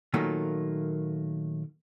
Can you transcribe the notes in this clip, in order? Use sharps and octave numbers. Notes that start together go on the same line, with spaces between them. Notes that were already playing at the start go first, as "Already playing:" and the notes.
A#2 D#3 F#3 A3 A#3 F4